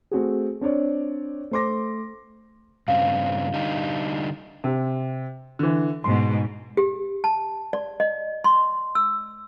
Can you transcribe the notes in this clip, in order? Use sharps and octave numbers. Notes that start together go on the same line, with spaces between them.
A3 C4 F#4 G#4
C4 D4 C#5 D5
A3 C5 C6 D6 A#6
G2 C#3 C4 F5
D3 G3 D#4
C3
D3 E3
G#2 B2 C6
G4
A5
D5
D#5
C6
E6